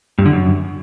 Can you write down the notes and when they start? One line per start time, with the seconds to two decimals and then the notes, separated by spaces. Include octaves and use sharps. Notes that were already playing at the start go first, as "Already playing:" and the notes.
0.18 G2
0.26 D3
0.33 F#2